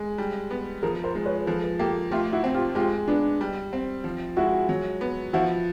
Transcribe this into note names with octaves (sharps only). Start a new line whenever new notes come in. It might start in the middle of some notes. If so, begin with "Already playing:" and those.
Already playing: G#3
G3
B3
F3 G#4 A#4
A#4 C5
G#3
B4 C#5
F3 A4 B4
A#3 G4 A4
A3 F4 G4
E4 F#4
C4
F4 G4
G#3 F4 G4
B3 D4
G3
C4
F3
G#3 E4 F#4
F#3
B3
F3 E4 F#4